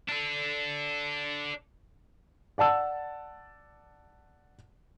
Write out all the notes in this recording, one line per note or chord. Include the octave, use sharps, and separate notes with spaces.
D4 A4
D5 F#5 A5 E6